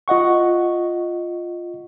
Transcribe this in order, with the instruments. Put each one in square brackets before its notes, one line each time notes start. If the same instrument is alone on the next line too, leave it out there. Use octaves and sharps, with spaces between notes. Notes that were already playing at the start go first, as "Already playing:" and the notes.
[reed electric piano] F4 D#5 F#5 C#6